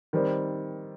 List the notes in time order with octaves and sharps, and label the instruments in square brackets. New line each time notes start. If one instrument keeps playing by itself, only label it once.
[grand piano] D#3 G3 C4